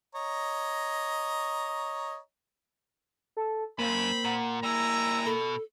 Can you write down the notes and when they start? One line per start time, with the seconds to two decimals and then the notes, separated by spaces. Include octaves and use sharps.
0.15 C#5 D#5 A#5
3.37 A4
3.79 F#2 A#3 C4 C5 B5
4.25 A#2 F#5
4.63 G3 E4 G#4 A#5 E6
5.26 B2 A4